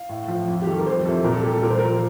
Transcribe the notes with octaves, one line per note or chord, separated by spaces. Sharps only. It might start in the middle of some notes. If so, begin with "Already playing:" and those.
Already playing: F5
A2
F3
F2
G4
D#3 G3 A4
A#4
F2 C5
C3 F3 A4
A#2 A#4
A4
G3 G4
A4
A#2 A#4
C5
F3 A#4